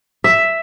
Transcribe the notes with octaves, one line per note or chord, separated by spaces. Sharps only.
E5